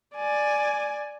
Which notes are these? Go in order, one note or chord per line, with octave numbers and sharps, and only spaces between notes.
D5 G#5